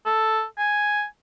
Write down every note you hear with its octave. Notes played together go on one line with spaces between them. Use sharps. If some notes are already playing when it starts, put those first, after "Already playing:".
A4
G#5